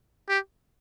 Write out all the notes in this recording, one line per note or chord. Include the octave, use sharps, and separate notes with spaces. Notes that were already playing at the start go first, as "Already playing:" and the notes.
G4